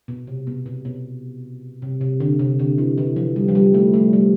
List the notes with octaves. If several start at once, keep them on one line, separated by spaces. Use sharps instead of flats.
B2
C3
B2
B2
B2
C3
C3
D3
C3
D3
E3
E3
F3
G3
F3
G3
A3
A3
G3